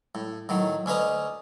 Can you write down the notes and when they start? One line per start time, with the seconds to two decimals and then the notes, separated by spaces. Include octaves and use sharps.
0.15 A2
0.49 A2 D#3 F#3
0.86 D2 C#4 B4 D#5 A#5